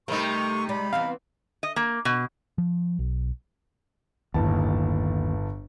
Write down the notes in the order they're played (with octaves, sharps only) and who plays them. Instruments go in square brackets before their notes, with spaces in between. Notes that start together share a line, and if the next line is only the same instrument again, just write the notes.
[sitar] C3 G3 D#4 [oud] A3 A#4 [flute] C#6
[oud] G#3 D5 [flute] B5
[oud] E3 B3 C4 [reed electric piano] F5
[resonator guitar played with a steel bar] D#5
A#3
B2
[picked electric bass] F3
B1
[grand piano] G1 A2 A5 [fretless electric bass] D#2